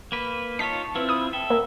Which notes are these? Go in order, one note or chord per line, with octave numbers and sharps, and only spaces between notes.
A#3 B4
D#4 F4 C#5 A5 B6
C4 E4 F4 B4
B5 D#6
A4 E5 G5
A#3